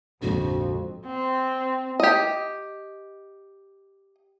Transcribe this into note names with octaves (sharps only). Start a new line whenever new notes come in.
A#1 F2 G#2 D3 F#4
C4
G4 D#5